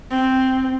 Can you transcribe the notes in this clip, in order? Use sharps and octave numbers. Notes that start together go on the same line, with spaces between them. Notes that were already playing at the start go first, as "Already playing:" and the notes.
C4